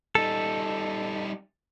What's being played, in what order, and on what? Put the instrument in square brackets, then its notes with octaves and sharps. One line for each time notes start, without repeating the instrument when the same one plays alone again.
[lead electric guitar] G3 D#4 [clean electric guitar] A4